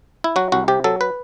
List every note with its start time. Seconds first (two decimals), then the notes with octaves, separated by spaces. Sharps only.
0.24 E4
0.36 F#3 F#4
0.52 C2 F#4
0.68 C3 G4
0.84 F#3 A4
1.01 B4